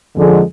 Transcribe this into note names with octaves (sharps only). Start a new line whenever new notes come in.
F2 D3 G#3